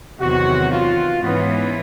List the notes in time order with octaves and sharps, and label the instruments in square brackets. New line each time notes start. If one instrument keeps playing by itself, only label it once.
[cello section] E2 C3 D#3 F#3 [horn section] F#4
[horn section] F4
[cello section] G#2 E3 G#3 C#4 [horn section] B3